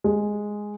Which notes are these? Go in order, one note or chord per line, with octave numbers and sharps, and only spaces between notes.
G#3